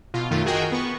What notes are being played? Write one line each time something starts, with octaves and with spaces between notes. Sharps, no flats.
B2 F4
F#2 D#3 A3 F4
F#4 G#4 A#4 D#5 G5 G#5
B3 C#6